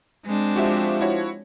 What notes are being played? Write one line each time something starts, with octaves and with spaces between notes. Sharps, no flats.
G#3 C4 D4
F3 F#4 G4 E5
E4 F#4 C#5